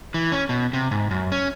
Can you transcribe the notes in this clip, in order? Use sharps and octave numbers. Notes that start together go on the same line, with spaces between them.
E3
C#4
B2
C3
G#2
F#2
C#4